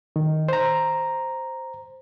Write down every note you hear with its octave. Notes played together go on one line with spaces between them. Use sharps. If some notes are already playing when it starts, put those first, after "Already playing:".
D#3
C5 A#5